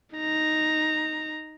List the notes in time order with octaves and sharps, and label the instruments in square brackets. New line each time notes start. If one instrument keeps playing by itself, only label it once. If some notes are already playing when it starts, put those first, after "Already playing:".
[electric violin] D#4 A#5